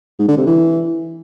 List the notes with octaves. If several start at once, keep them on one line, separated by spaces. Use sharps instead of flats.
G#2
D3
C3
E3